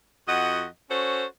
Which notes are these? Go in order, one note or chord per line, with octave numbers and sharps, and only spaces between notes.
F2 F#4 D#5 F#5
C#4 F#4 A4 C5 C#5